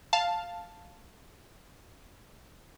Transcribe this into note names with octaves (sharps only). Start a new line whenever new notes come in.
F5 A5